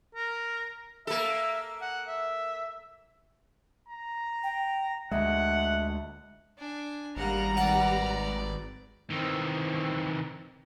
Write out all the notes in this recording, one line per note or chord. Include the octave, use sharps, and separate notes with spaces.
A#4
A#3 A4 E5
F#5
E5
A#5
G5
D2 G#3 E5 F#5
D4 G#5
G#1 G3 A#3 F#5 A#5
B4 D5 F#5
D#3 E3 C4